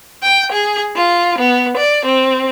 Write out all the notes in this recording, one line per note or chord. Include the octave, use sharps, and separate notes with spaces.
G5
G#4
F4
B3
D5
C4